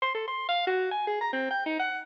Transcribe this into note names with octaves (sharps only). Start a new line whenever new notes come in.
C6
A4
C6
F5
F#4
G#5
G#4
A#5
C4
G5
D#4
F#5